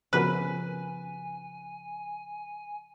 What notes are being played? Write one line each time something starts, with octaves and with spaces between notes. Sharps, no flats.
C#3 F3 B3 F#4 A#4 B4 G#5